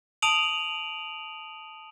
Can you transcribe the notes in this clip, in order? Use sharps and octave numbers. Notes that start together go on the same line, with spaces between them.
A5 D#6 D7 D#7 F7 F#7